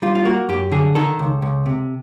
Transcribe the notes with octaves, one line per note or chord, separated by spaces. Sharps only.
G3 F4
F4
A#3 F#4
F#2 G4
D3 G#4
D#3 A4
C#2
C#2
C3